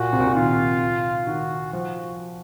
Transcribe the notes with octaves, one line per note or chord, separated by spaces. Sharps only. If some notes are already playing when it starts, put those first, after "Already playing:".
Already playing: A#2 F#4
C3
A#2
C3
D#3 F4
D#3 F#4
F3 F#4